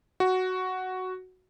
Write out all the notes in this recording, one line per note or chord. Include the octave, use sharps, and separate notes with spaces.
F#4